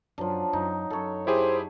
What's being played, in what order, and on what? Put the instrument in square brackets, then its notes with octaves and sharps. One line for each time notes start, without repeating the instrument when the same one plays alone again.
[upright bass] F#2 [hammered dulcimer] F3 F#3 D4
[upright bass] F#2 [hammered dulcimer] D#4
[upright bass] F#2 [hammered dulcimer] A4 C#5
[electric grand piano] E4 G4 G#4 [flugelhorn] C5